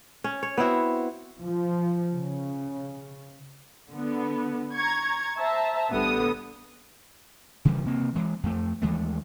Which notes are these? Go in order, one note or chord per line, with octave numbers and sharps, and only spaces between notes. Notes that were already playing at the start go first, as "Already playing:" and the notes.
C#4
C#5
B3 C4 E4 F#4
F3
C#3
D3 B3
A#5 C#6 G#6
C5 E5 A5 A#5
A1 D3 G3 B3 D#6
C#3 E3 F3 G3
C3 A#3 C4
E3 G#3
F2 A3
D#2 E3 G#3 A3